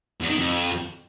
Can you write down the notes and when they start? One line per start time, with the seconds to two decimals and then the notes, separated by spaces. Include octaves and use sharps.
0.21 E2
0.29 D#3
0.38 F2